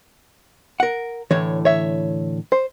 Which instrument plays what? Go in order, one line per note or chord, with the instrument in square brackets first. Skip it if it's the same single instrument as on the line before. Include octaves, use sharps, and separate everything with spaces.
[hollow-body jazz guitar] A#4 F#5
[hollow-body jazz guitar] A2 D3 E3 [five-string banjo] C#5
[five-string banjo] C#5 E5
C5